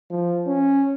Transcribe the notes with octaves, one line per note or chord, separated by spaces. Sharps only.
F3
C#4